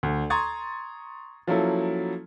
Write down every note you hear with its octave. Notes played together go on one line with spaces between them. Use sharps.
D2
A#5 C6 C#6 D#6 G#6 A6
F3 F#3 A#3 C#4 E4 A4